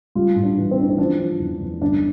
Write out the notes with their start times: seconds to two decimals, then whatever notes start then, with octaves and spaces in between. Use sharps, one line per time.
0.15 G3 F4
0.36 A2
0.43 D4
0.57 E3
0.71 C4
0.78 E3 D4
0.90 C4
0.98 F3 D4
1.19 F3
1.40 E2
1.61 E2
1.82 G1 D4